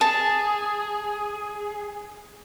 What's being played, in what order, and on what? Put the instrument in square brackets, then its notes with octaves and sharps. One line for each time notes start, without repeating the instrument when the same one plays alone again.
[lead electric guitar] G#4 [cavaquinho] A5